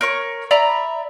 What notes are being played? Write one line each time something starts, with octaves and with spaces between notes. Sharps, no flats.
A#4 C#5 C#6
D5 E5 A#5 B5